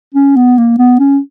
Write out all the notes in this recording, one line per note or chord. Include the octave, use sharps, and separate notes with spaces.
C#4
B3
A#3
B3
C#4